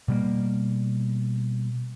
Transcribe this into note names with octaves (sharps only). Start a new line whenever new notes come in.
B2 G3 A#3